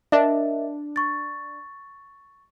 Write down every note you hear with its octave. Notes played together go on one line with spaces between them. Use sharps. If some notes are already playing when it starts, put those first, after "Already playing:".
D4 A#4 D#5 E5
C#6 A6